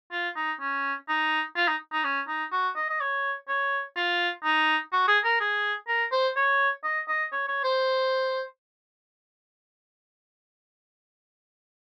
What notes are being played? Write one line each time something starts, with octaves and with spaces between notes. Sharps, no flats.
F4
D#4
C#4
D#4
F4
D#4
D#4
C#4
D#4
F#4
D#5
D#5
C#5
C#5
F4
D#4
F#4
G#4
A#4
G#4
A#4
C5
C#5
D#5
D#5
C#5
C#5
C5